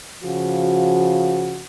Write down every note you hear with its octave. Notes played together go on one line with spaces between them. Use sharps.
C#3 F3 F#4